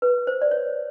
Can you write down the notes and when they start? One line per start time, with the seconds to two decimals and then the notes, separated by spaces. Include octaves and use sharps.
0.02 B4
0.27 C5
0.42 D5
0.51 C#5